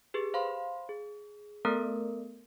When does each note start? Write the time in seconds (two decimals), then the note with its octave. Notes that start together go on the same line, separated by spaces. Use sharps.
0.14 G4 G#4 B4
0.34 C5 F5 B5 C6
0.89 G#4
1.65 A3 B3 A4 A#4